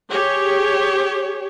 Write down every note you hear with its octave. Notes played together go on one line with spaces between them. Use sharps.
G4 G#4 C#5